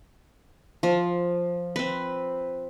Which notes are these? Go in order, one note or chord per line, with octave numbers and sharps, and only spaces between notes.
F3
C4 B4